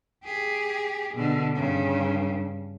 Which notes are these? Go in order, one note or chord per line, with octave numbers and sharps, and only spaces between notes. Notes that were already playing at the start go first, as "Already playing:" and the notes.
G4 G#4
B2 D3
G2 C#3